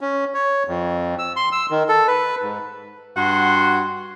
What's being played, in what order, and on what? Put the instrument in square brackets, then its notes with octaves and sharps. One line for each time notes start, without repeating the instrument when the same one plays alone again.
[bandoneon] C#4
C#5
F2
E6
C6
E6
D#3
A4
B4
G#2
[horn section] G2 F#4 F#5 C6